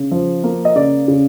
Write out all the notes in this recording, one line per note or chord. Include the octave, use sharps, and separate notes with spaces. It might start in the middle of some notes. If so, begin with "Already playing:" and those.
Already playing: C#3
F3
A#3
D#5
C#3 D5
C#3